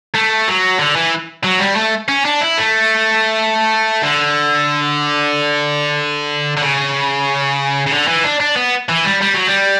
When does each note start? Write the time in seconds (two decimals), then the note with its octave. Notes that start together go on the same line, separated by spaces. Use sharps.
0.14 A3
0.47 F#3
0.79 D3
0.96 E3
1.44 F#3
1.60 G3
1.76 A3
2.09 C#4
2.25 D4
2.41 E4
2.57 A3
4.03 D3
6.57 D3
6.62 C#3
7.87 C#3
7.92 D3
8.08 E3
8.24 D4
8.40 D4
8.56 B3
8.89 E3
9.05 G3
9.21 G3
9.34 F#3
9.47 G3